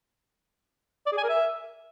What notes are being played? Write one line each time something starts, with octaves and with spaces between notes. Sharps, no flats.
D5
G#4
G#5
A#4
E5